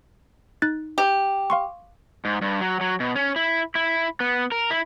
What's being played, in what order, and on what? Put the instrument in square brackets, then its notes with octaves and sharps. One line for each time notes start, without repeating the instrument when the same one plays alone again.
[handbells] D#4 F#6 A6
[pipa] G4
[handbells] F5 C6 C#6
[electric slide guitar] G#2
G2
F#3
F#3
B2
C#4
E4
E4
B3
A#4
E4